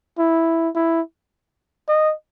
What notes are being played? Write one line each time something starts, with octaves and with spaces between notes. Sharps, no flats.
E4
E4
D#5